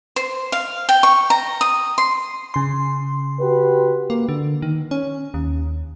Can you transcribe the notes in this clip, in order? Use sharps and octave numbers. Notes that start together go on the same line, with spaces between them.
C5
F5
G5
C#6
A#5
D#6
C6
C#3 C6
F#4 G4 B4
A#3
D3
D#3
C#4
D#2